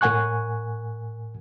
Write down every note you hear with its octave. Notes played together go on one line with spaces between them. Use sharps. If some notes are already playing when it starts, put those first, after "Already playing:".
A2 A#4 F#5 G#5 C#6 F#6